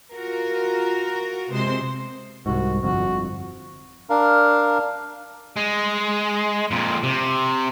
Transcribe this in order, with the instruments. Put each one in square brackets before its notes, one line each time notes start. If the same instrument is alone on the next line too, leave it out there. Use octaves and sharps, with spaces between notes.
[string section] F4 F#4 A#4
C3 G#3 C5 C6
[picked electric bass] C2 G#2 [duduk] F#4
[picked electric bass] G1 F2 [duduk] F#4
[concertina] D4 A#4 F5
[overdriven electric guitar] G#3
F2 A#2
C3